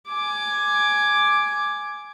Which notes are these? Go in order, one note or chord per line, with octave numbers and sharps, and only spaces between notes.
G#5 D6